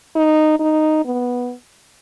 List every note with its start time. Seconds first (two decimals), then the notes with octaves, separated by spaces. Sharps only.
0.16 D#4
0.59 D#4
1.05 B3